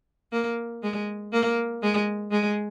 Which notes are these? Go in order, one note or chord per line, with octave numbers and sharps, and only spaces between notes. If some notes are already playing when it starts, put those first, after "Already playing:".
A#3
G#3
A#3
G#3
G#3